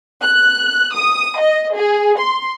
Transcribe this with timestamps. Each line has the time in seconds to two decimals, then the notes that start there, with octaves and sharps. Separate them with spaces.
0.23 F#6
0.93 D#6
1.40 D#5
1.76 G#4
2.19 C6